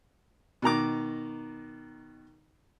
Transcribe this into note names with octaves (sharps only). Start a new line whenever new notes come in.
B2 D#3 A#5 D6